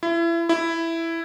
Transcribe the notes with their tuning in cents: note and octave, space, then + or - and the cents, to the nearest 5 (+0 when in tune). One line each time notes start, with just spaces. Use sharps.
E4 +30
E4 +5